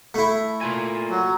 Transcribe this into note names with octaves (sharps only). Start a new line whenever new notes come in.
A3 E4
A#3 F4 G#5
F#3